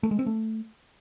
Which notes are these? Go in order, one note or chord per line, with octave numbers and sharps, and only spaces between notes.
A3
G#3
C4
A3